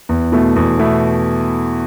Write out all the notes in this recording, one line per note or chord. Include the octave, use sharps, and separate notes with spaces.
E2
B2 A3 E4
E2
B2 A3 E4